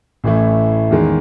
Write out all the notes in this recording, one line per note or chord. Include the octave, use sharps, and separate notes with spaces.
A1 A2 E3 A3 E4
E2 D#3 G#3